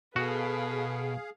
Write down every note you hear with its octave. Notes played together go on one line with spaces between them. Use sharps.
B2 F#4 G#4 A4 B4 F5